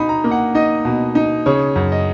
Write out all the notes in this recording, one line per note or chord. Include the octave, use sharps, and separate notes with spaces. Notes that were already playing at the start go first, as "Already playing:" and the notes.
Already playing: B2 D#4 B5
A#5
A#3
F#5
D#4 D#5
B2
D#4
C#3 C#5
F#2
D#5